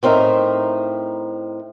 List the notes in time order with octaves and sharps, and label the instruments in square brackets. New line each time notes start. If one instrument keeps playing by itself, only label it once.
[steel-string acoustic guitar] A2 C4 D#4 A#4 E5